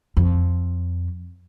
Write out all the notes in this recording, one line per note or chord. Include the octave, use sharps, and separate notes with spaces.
F2